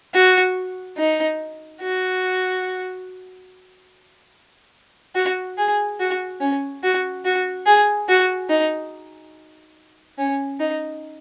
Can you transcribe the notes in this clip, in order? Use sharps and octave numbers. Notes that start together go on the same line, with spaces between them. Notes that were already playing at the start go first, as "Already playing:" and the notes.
F#4
D#4
F#4
F#4
G#4
F#4
C#4
F#4
F#4
G#4
F#4
D#4
C#4
D#4